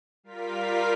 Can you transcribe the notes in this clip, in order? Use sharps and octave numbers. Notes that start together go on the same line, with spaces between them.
G3 F4 A#4 F5 B6